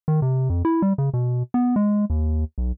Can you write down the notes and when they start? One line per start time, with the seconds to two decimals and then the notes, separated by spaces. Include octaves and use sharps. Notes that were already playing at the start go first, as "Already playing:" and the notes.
0.08 D#3
0.22 C3
0.50 F2
0.65 E4
0.82 G3
0.98 C#3
1.14 B2
1.54 B3
1.76 G#3
2.10 D#2
2.58 B1